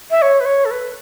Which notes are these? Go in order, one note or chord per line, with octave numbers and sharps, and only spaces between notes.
E5
C#5
B4
C#5
A4
B4